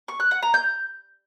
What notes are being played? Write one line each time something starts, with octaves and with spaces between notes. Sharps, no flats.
C#6
F#6
F#5
A#5
G6